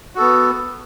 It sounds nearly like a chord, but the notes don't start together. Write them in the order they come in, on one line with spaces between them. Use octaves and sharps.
F#4 A4 B3